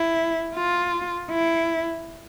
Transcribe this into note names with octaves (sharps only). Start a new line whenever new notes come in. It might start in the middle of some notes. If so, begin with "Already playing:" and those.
Already playing: E4
F4
E4